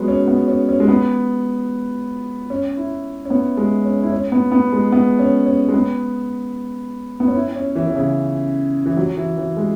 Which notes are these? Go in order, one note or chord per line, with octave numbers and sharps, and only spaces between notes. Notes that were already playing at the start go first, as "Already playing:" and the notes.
Already playing: F#3 G#3 B3
C#4
B3
C#4
C#4
G#3
B3
C#4
E4
C#4
B3
G#3
C#4
E4
C#4
B3
B3
G#3
B3
C#4
C#4
G#3
B3
B3
C#4
E4
C#4
E3
E3
C#3
E3
F#3
E3
E3
G#3